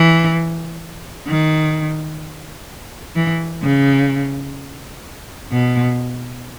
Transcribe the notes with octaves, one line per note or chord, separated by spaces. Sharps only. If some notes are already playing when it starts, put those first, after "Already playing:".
Already playing: E3
D#3
E3
C#3
B2